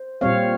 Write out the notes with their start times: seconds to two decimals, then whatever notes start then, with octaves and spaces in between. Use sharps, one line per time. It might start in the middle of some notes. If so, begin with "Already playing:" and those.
Already playing: C5
0.21 A#2 G3 C4 C#5 F5